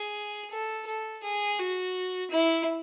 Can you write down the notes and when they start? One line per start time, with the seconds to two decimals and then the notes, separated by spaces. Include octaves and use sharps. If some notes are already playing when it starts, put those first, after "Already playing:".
Already playing: G#4
0.51 A4
0.87 A4
1.24 G#4
1.59 F#4
2.31 E4